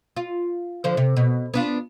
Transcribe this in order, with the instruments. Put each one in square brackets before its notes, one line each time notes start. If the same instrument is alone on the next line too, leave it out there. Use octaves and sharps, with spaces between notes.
[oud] F4
D3 F3 C5
C3
B2
B3 D4 F4